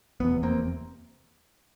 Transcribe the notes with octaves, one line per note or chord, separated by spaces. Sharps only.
F1 E2 C3 B3
A#3 C4